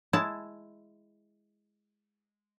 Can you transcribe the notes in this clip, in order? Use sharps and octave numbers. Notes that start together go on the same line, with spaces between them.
G#3 E4 A5